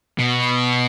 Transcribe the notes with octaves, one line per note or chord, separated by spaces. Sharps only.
B2